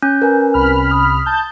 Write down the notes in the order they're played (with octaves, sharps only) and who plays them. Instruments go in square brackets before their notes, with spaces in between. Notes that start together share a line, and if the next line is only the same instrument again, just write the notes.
[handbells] C#4 [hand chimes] G6
[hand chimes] A#4 B4 G#5
[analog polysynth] C2 B5 F6
[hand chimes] D#6
[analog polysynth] A5 G6